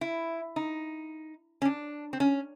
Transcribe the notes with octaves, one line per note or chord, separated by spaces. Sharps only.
E4
D#4
C#4
D4
C4
C#4